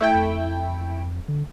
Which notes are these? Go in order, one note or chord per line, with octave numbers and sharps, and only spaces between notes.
A3 E4 G5
F2
D3